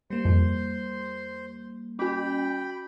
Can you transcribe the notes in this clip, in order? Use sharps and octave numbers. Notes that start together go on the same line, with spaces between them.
G3 A#3 C5 C6
F2
C#4 F#4 G5 B5